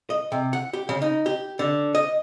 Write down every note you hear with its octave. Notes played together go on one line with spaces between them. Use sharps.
D#5
C3
F#5
G4
C#3
D#4
G4
D3
D#5